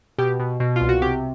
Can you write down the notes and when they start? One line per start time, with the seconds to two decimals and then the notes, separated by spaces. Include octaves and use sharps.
0.18 B2 G4
0.40 B2
0.60 B2
0.76 C2 F4
0.89 F#4
1.02 C3 G4